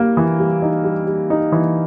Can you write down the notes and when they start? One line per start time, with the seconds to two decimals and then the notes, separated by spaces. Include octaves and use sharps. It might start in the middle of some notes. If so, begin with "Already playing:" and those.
Already playing: G3 A#3
0.17 E3
0.39 G3
0.62 D#4
0.84 G3
1.07 G3
1.30 D#4
1.52 E3